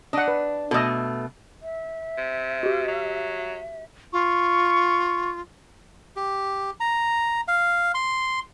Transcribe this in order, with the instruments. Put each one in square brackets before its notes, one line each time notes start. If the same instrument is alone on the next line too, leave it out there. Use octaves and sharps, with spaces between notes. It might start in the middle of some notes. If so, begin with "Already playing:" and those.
[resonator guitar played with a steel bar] D4 [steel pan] D#5 F#5
[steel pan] B4
[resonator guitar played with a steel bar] B2 A3 [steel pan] A4 D5 D#5
[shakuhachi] E5
[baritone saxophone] C3
[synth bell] F#4 G4
[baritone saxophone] F#3
[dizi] F4 [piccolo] C#6
[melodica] G4
A#5
F5
C6